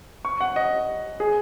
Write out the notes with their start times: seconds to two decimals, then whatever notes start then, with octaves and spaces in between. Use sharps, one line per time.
0.25 C#6
0.41 F#5
0.56 D#5
1.20 G#4